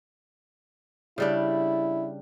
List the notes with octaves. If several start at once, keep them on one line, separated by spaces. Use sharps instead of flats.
C#3 G3 D4 E4